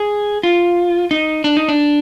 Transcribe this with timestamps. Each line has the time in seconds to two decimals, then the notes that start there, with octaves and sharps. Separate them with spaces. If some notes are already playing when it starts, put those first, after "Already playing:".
Already playing: G#4
0.43 F4
1.11 D#4
1.44 D4
1.57 D#4
1.68 D4